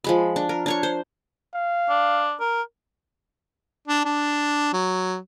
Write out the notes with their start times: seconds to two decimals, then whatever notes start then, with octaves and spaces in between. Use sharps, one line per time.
0.04 F3 G#3 B5
0.36 D4
0.49 A#4
0.66 D4 C#5 C#6
0.83 C5
1.54 F5
1.89 D4
2.40 A#4
3.88 D4
4.05 D4
4.73 F#3